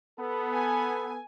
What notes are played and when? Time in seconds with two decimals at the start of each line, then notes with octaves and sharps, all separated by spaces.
0.19 B3 A4
0.54 G#5